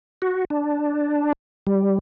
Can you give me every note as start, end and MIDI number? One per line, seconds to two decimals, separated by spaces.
0.22 0.45 66
0.50 1.33 62
1.67 1.99 55